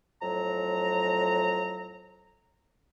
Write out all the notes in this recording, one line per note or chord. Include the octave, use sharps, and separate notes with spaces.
F2 A2 F#3 A#5